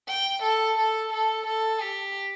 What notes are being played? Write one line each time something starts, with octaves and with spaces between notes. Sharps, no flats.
G5
A4
A4
A4
A4
G4